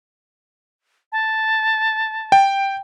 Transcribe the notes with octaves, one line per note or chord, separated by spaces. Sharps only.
A5
G5